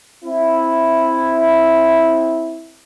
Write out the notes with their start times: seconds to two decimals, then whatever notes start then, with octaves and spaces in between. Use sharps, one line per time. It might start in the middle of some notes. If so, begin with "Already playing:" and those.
0.24 C4 E4